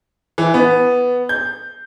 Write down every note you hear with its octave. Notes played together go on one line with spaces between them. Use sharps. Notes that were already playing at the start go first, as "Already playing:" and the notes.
E3
B3
G6